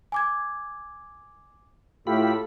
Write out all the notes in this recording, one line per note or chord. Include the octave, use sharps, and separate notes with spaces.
G#5 D6 G#6
A2 F4 G4 A4 B5